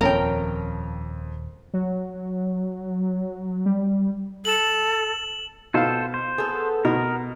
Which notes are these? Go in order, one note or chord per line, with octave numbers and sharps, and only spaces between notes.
D#1 F2 F3 C#4 A#4 G5
F#3
G3
A4 E7 F#7
B2 F4 A4 C5 F5
C5
B3 G#4 A4
B2 B3 A#4